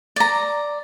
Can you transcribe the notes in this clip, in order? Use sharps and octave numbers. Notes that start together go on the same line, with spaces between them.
D5 A#5